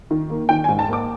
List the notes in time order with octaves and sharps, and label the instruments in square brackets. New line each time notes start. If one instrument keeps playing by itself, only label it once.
[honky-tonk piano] D#3
A#3
D#3 G5
G#5
G#2
A5
A#3 D6